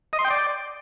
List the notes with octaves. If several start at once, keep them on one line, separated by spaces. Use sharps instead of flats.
D#5
C6
G5
D5